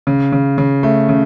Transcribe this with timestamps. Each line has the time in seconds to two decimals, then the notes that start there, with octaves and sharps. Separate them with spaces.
0.07 C#3
0.32 C#3
0.58 C#3
0.83 A3
1.09 C#3